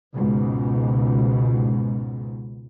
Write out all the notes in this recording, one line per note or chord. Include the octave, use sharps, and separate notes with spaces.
C#2 G#2 B2